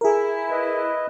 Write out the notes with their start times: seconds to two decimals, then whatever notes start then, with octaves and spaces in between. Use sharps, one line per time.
0.01 E4 G#4 A#4
0.51 B4 D#5